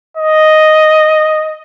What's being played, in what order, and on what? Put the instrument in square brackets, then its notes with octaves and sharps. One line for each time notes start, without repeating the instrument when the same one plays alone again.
[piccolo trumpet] D#5